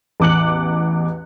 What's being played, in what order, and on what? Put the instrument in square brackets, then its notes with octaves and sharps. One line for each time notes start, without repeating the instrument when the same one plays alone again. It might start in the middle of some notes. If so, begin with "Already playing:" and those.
[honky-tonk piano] A1 E2 D6 F#6 C#7 F#7